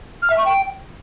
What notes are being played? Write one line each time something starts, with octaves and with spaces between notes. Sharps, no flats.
F6
E5
C#6
G5